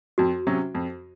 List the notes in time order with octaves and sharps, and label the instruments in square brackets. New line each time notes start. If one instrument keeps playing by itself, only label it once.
[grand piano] F2 [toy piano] F#4
[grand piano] C3 F#3 C#4
F2